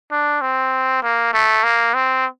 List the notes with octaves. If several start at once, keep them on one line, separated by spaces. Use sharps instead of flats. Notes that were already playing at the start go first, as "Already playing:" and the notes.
D4
C4
A#3
A3
A#3
C4